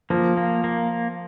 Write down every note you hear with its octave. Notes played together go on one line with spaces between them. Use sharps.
F3 A#3
A#3
A#3